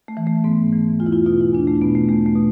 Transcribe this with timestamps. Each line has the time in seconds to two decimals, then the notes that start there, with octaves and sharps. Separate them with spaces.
0.08 A3
0.17 E3
0.27 A3
0.44 G#2 B3
0.73 E3
1.00 E2 F4
1.06 E4
1.13 F4
1.26 B2 F4
1.41 E4
1.53 E2 D4
1.68 A3
1.82 B2 B3
1.95 A3
2.08 E2 A3
2.26 A3
2.35 B2